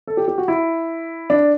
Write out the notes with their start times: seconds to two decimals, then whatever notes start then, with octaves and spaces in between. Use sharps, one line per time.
0.07 A4
0.17 G4
0.28 G4
0.38 F#4
0.48 E4
1.30 D4